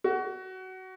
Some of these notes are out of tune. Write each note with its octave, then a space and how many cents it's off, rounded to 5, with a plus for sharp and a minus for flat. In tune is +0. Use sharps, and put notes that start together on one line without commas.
F#4 +20